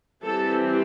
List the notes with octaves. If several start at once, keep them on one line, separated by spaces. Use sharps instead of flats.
E3 G3 C4 A4